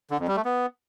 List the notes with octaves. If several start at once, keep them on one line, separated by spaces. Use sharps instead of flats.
D3
F2
G3
A3
B3